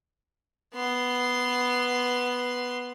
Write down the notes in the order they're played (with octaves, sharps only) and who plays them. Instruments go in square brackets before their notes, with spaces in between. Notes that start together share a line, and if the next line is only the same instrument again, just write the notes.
[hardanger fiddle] B3 C6